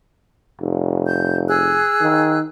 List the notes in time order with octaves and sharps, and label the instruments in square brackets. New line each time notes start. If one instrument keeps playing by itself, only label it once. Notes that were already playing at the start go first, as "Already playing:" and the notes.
[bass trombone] F1
[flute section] G6
G#4 E6 F#6
[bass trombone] D#3